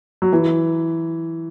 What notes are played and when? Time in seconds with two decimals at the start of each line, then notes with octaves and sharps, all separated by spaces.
0.22 F#3
0.32 E3